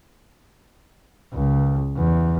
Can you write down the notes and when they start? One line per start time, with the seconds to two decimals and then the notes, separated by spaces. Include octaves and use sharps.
1.33 C#2
1.97 E2